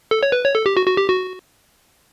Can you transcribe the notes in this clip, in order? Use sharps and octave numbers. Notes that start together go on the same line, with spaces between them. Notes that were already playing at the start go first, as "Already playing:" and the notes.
A4
C#5
B4
C#5
A4
G4
F#4
F#4
G4
F#4